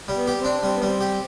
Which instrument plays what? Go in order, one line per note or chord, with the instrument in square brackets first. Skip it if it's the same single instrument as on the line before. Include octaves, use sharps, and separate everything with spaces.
[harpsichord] G3
[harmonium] B3
[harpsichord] G4
[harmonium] C4
[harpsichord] D4
[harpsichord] G3 [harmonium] C4
[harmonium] B3
[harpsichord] G3 [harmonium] C4
[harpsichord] G4